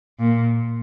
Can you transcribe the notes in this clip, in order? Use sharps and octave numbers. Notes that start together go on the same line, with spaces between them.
A#2